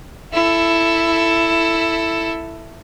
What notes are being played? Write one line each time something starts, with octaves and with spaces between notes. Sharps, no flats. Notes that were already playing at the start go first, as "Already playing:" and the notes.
E4 A4